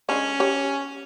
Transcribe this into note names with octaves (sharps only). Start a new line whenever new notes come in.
G#3 C#4 D4
G4 C#5